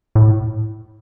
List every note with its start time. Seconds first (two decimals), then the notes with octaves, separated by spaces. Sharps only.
0.15 A2